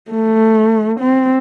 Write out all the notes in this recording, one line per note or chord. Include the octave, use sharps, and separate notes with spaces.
A3
C4